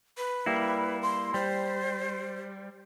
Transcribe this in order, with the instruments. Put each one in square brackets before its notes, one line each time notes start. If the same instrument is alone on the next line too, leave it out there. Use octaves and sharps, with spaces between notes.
[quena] B4
[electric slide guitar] G3 A#3 E4
[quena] C6
[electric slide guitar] G3 [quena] C5